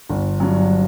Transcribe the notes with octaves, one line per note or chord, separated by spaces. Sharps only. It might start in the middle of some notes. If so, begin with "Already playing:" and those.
G1
G2 F#3